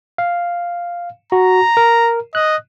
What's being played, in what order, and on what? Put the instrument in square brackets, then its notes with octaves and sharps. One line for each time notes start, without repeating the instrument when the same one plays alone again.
[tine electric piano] F5
[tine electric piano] F#4 [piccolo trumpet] A#5
[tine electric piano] A#4
[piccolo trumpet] D#5 [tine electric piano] F#6